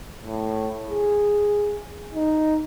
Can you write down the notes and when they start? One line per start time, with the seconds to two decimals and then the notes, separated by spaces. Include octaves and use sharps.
0.21 A2
0.89 G#4
2.14 D#4